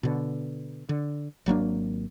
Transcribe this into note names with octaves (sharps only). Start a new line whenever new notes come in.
B2 D3
D3
G#1 F#3 A#3 D4